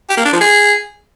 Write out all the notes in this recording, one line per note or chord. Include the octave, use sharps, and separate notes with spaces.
G4
A#3
D4
F3
G#4